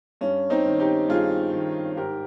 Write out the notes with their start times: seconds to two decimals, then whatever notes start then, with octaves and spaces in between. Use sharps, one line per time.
0.21 G2 C#4
0.50 C4 D#4
0.66 D#3
0.80 D#4 G4
1.09 G2 F4 G#4
1.53 D#3
1.97 G#2 G4 A#4